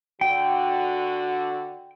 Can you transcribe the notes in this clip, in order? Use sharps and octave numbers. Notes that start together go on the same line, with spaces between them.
D3 F#4 G5